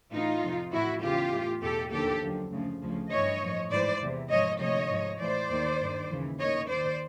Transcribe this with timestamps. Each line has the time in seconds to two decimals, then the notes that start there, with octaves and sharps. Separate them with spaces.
0.13 A2 E3 D#4 F4
0.43 F2 C3 F3
0.72 A2 E3 E4 F#4
1.02 E2 C#3 E3 F4 G4
1.32 A2 E3
1.62 E2 B2 G4 A4
1.92 D#2 D3 F3 G4 A4
2.22 F#2 D3 F3
2.52 D2 C#3 F3
2.82 D2 C#3 F3
3.11 G2 E3 C#5 D#5
3.41 A2 F3
3.71 G#2 E3 C5 D5
4.01 E2 C3 E3
4.30 G#2 F3 C#5 D#5
4.60 D2 C3 F3 C#5 D#5
4.90 G#2 F3
5.20 A2 E3 C5 D5
5.50 D#2 D#3
5.80 G2 D#3
6.10 D#2 C#3 E3
6.40 D#2 D#3 C#5 D#5
6.69 D#2 D#3 C5 D5